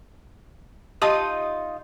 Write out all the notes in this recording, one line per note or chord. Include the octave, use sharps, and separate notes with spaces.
D#4 F4 G4 A5 C6 D#6